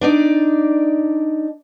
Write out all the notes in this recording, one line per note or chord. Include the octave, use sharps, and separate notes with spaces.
D4 D#4 D5